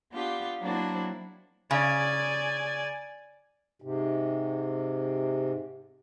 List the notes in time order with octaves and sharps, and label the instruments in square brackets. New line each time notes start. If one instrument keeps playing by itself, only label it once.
[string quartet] B3 D4 F4 G4
F#3 A#3 C4 D4 E4 F#4
[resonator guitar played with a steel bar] C#3 [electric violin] D5 G#5
[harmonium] G#2 C3